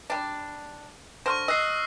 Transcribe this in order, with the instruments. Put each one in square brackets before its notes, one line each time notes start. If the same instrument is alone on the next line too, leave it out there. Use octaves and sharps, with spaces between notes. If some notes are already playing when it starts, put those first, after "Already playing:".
[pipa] G3 D4
[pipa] D3 C5 [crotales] C#6 F6 A#6
[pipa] D#5 [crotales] E6 F#6 C7